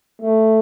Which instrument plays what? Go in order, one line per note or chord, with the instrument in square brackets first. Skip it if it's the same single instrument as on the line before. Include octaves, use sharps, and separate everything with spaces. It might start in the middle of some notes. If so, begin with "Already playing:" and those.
[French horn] A3